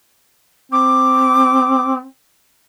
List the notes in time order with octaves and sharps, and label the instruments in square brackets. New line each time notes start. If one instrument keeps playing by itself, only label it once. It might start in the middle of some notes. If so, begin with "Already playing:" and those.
[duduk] C4 [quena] D6